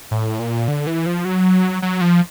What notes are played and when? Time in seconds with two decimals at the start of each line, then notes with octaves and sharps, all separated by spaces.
0.11 A2
0.40 A#2
0.68 D3
0.87 E3
1.06 F3
1.25 F#3
1.82 F#3
2.01 F3